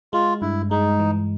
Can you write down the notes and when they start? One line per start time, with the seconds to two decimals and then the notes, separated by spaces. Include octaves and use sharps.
0.13 G#3 F4
0.42 G2 E4
0.71 G#3 D#4
1.00 E3